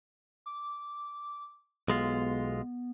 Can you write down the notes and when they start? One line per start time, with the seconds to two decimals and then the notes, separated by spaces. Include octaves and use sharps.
0.46 D6
1.88 B1 G#3 B3 F4